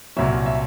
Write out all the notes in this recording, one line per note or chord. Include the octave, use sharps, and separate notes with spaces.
C2 A#2 F#3 E5
E5